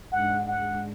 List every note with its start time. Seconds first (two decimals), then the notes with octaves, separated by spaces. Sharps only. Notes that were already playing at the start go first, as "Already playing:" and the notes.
0.12 G#2 G#3 D4 F#5
0.47 F#5